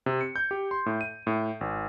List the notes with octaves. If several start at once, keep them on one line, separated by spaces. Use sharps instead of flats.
C3
C#7
G6
G4
C6
A2
D#7
A2
G#1